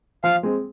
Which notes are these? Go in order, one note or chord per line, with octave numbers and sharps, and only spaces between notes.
F3 F5
G#3 C4